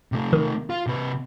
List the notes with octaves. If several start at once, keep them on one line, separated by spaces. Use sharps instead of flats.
C3 A3
D#3
F4
C3 B4